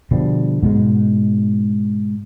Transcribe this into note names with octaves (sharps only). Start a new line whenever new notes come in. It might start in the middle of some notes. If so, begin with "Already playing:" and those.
B2 D3 F3 G3
G#2 B2 G#3